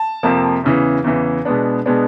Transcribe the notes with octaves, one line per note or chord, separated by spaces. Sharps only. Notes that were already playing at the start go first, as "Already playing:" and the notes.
Already playing: A5
F2 C3 F3 A#3
E2 C#3 E3
E2 C#3 E3
B2 G#3 B3 D4
B2 G#3 B3 D4